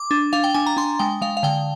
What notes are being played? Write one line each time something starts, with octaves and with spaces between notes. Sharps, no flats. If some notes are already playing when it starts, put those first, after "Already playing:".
Already playing: D6
D4
D4 F5
G5
D4 G#5
A#5
D4 C6
G#3 G5
G#3 F5
F5
D3 G5